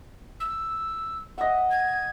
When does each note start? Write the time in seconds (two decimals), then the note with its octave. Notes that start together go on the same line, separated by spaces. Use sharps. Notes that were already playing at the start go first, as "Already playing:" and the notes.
0.40 E6
1.38 D#5 E5 F#5
1.70 G#6